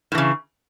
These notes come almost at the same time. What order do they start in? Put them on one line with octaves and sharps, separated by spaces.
A2 E3 C#3